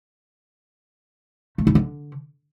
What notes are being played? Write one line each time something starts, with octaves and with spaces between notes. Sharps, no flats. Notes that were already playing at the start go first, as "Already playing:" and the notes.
A3
E4
D3